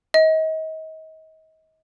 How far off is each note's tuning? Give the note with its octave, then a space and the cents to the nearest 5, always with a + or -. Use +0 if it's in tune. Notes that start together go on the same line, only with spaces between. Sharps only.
D#5 +35